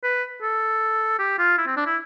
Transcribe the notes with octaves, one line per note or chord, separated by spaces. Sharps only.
B4
A4
G4
F4
E4
C4
D4
E4